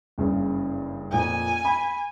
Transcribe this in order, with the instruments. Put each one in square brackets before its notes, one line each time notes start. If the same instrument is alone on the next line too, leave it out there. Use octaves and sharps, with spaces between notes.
[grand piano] F#1 G2 C#3
[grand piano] F2 A#2 [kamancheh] G#5
[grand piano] B5